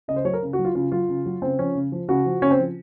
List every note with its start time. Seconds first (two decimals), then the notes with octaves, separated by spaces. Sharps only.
0.08 C#3 D#5
0.16 C5
0.25 F#3 C#5
0.33 A#4
0.43 C#3
0.53 F#4
0.59 F#3
0.65 F4
0.75 C#3 F4
0.92 F#3 F4
1.09 C#3
1.26 F#3
1.42 C#3 C4
1.59 F3 C#4
1.75 C#3
1.92 F3
2.08 C#3 F#4
2.26 F3
2.42 C#3 C#4
2.51 C4
2.59 F3